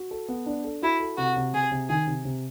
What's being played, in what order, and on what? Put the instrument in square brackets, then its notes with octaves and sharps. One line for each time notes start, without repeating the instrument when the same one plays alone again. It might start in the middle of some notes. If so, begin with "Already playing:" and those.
Already playing: [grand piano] F#4
A4
B3
D4
A4
[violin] E4 [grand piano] F#4
[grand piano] A4
[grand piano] C3 [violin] F#4
[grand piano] C3
[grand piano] C3 [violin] G#4
[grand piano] C3
[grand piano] D#3 [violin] G#4
[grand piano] C3
C3